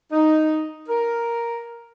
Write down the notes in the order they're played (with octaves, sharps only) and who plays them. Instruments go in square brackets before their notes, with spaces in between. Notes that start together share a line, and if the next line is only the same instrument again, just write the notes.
[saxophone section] D#4
A#4